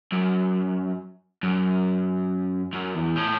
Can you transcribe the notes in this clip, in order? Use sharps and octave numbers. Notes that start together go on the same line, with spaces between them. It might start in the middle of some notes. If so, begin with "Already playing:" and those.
F#2
F#2
F#2
E2
A2